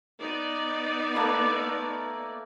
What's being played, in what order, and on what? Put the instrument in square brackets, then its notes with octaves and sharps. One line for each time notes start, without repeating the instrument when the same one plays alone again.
[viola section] B3 D#4 D5
[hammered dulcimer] A3 A#3 B4